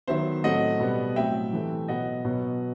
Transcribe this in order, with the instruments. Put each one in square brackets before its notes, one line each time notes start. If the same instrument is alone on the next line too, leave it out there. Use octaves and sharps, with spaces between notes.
[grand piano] D#3 F#3 B3 C5 E5
A2 F#3 A3 C4 D#5 F#5
B2 G3 B3
A2 F#3 C4 E5 G5
C3 E3 A3 C4
B2 F#3 B3 D#5 F#5
B2 F#3 B3